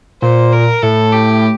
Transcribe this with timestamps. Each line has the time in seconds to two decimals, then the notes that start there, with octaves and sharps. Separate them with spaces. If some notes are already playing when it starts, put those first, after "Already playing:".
0.22 A#2 C5
0.52 A#4
0.82 A2 A4
1.12 G4